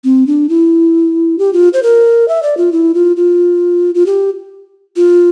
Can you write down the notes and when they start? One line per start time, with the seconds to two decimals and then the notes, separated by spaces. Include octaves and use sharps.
0.04 C4
0.27 D4
0.49 E4
1.39 G4
1.53 F4
1.73 C5
1.83 A#4
2.28 E5
2.43 D5
2.57 F4
2.72 E4
2.95 F4
3.17 F4
3.95 F4
4.06 G4
4.96 F4